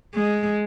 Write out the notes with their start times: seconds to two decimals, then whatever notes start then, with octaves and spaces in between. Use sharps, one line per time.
0.14 G#3